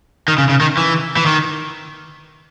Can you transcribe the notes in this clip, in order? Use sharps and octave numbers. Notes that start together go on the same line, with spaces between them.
D#3
C#3
C#3
D#3
E3
E3
D#3